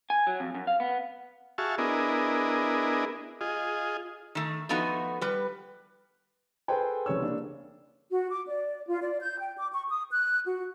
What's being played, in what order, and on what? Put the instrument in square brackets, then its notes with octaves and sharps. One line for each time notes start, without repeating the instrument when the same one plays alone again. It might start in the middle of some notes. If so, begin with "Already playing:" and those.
[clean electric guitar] G#5
F#3
F2
F#2
F5
B3
[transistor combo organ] F#4 G#4 E5 F5 A5 C#6
B3 D4 E4 G#4 A#4 D#5
F4 G#4 D#5
[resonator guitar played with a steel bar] D#3 A3
F3 A3 B3 D#4 F#4
G3 B4
[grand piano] G#4 A4 B4 C5 G5 G#5
C2 C#3 G3 C#5 E6
A#3 D4
[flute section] F#4
D6
D5
F4
D5
G6
G5
D6
C#6
D#6
F#6
F#4